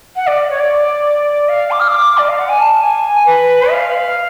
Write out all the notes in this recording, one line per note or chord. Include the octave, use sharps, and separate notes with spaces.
F#5
D5
C#5
D5
F5
D6
F6
D6
D5
F5
F#5
G#5
A5
G#5
B4
F5